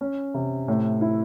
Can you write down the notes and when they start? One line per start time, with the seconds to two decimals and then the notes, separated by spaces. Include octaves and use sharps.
0.01 C#4
0.34 C3
0.68 A2
1.01 E4